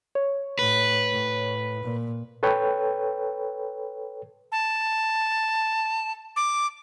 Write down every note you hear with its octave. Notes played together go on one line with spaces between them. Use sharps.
C#5
A2 B4
A2
A#2
A4 B4 C#5 G5
A5
D6